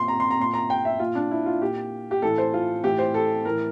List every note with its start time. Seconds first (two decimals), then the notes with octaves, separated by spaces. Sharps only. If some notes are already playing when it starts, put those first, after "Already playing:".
Already playing: A#2 C6
0.08 A#5
0.20 C6
0.31 A#5
0.39 A#2 C6
0.54 A#5
0.70 G5
0.85 E5
0.99 A#2 F4
1.15 D4
1.31 E4
1.46 F4
1.62 A#2 G4
2.11 G4
2.22 A2 E3 A4
2.38 C5
2.54 F4
2.84 A2 E3 G4
2.98 C5
3.14 A4
3.45 A2 E3 A#4